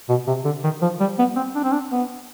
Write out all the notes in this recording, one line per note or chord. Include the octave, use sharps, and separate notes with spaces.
B2
C3
D3
D#3
F3
G3
B3
C4
D4
C4
D4
B3